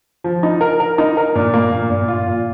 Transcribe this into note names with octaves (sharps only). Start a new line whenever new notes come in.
F3
D#4
A#4
A#4
D#4
A#4
A#2
A#3
A#2
A#2
F4
A#2